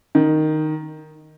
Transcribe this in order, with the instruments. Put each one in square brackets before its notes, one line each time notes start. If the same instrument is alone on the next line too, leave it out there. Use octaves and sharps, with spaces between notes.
[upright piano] D#3